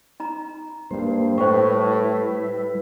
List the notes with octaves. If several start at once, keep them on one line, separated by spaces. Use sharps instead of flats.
D#4 A#5
G2 G3 A#3 C5
A2 G3 E4 B4 C5 G5 C#6